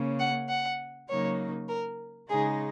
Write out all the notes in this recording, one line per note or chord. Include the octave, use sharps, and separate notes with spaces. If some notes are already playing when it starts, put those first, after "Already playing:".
Already playing: C#3 A#3 C#4
F#5
F#5
C#3 F#3 A#3 D#4 C#5
A#4
C#3 G#3 D#4 G#4